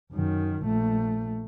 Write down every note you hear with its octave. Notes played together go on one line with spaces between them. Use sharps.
F#2 D#3
A#1 A3